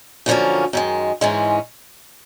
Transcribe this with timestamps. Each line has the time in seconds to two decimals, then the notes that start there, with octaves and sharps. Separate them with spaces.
0.26 F#2 D3 F3 A#3 C#4
0.73 F#2 D#3 G#3
1.21 G#2 E3 G#3 C#4